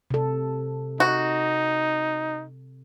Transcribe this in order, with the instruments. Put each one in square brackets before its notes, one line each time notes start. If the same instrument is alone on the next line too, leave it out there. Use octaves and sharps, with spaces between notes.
[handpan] C3 A4
[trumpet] D#4 [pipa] F#4